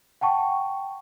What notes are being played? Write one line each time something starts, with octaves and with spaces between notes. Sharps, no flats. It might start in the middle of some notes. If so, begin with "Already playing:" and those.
F#5 G5 A5 C#6